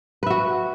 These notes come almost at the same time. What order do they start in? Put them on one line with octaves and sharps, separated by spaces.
B4 E5 F#4